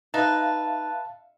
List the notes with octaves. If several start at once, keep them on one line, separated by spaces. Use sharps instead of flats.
D#4 B4 E5 F5 A5